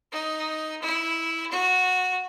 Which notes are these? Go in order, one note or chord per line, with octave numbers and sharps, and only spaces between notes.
D#4
E4
F#4